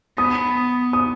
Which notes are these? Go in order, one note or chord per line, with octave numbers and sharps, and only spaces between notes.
B3 D#6
D#6